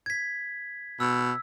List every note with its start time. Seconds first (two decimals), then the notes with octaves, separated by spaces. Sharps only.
0.06 G#6 B6
1.00 B2 E6